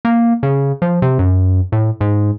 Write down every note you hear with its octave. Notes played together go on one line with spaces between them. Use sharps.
A#3
C#3
F3
C3
F#2
A2
G#2